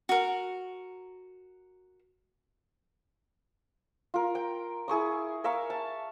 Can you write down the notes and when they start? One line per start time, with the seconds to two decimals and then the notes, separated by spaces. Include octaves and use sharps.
0.09 F#4 A#4
4.14 F4 A#4
4.35 G5
4.88 E4 G#4 C#6 D#6
5.44 A#4 E5 F5 C#6
5.70 A5